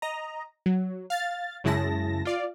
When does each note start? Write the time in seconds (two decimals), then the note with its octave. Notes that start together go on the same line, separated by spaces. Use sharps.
0.02 D#5 A#5
0.66 F#3
1.10 F5 A6
1.64 F#2 C#3 G#3 E4 A5 A#6
2.25 F4 D5 F5